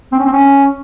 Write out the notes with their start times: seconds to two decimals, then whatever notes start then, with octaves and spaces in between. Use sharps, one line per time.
0.12 C4
0.19 C#4
0.26 C4
0.33 C#4